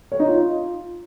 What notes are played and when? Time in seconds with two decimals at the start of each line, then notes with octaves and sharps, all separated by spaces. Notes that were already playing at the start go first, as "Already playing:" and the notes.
0.12 C#5
0.20 D#4
0.28 F4